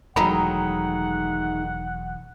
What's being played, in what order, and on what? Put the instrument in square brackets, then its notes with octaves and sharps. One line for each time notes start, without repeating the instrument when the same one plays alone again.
[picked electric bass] E1 F#3 [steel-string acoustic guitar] D#3 G#3 A3 [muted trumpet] F#5 [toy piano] A#5 B5